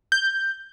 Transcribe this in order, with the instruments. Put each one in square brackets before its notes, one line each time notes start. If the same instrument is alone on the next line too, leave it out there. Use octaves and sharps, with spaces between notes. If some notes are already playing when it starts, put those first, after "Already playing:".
[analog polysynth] G6